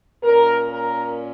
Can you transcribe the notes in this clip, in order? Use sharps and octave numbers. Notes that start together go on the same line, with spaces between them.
A#2 A#3 C#4 A#4
A#4